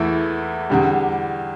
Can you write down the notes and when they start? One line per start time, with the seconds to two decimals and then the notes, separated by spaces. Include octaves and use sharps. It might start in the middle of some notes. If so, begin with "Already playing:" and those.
Already playing: E2 E3 A3 E4
0.70 E2 D3 G3